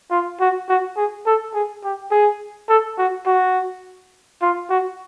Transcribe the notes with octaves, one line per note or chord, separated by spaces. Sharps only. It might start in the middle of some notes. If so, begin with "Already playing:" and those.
F4
F#4
F#4
G#4
A4
G#4
G4
G#4
A4
F#4
F#4
F4
F#4